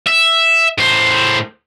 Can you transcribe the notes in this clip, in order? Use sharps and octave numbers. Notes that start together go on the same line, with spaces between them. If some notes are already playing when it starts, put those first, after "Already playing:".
E5
A2 C5